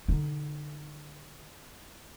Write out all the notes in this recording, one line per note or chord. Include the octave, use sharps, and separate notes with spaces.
D3 D#4